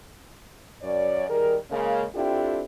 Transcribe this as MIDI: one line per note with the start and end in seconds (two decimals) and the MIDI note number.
0.81 1.28 42
0.81 1.28 73
0.81 1.28 74
1.28 1.56 51
1.28 1.56 55
1.28 1.56 68
1.28 1.56 70
1.70 2.04 49
1.70 2.04 56
1.70 2.04 58
2.14 2.63 60
2.14 2.63 62
2.14 2.63 64
2.14 2.63 65
2.14 2.63 67
2.14 2.63 69